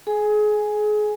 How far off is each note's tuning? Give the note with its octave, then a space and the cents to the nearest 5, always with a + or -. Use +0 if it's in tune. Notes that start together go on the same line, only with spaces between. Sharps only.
G#4 +30 G#5 +0